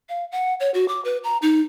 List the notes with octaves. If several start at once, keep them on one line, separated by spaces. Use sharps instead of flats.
F5
F#5
C#5
F#4
D6
B4
A#5
D#4